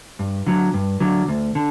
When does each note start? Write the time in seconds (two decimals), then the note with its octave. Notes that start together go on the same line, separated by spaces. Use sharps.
0.19 G2
0.47 D3 F#3
0.74 G2
1.00 D3 F#3
1.28 D2
1.55 D3